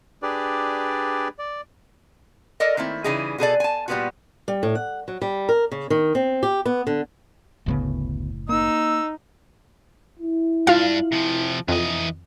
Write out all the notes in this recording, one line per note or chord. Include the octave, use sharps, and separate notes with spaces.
D4 G4 G#4 B4 D5
D5
A4 A#4 D5 D#5
D#3 A3 A#3 C4 E4
C#3 E3 G3 D#4 E4 G#4
B2 G#4 A4 D5
G#5 A5
A#2 G3 A#3 B3 F4 F#4
G3
A2
F#5
F#3
G3
A#4
C#3
D#3
C4
G4
B3
D3
F#1 D2 A2 C#3 G#3 B3
A#3 D#4 E6
E4
G2 D4 F4 F5
C3 F3
F2 E3 D#5